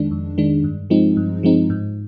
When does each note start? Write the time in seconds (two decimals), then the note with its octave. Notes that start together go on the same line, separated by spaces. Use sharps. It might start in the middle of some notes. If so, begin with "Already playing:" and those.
Already playing: F2 D#3 G#3 D4
0.11 F2
0.38 D#3 G#3 D4
0.64 G2
0.90 F3 G#3 C4 D#4
1.17 G2
1.43 F3 G#3 C4 D#4
1.70 G#2